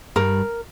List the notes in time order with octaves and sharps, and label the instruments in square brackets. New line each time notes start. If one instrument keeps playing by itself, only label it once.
[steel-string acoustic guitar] G2 G3 [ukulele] A#4